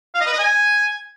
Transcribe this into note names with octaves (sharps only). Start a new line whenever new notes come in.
F5
D#5
B4
D#5
G#5